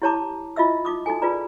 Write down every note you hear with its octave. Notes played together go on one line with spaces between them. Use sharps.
E4 G4 C#5 A5 A#5 D6
E4 F4 D#5 E5 E6
D#4 F4 D6 D#6
D#4 F#4 A4 G#5
D#4 F4 G#4 B4 D5 A#5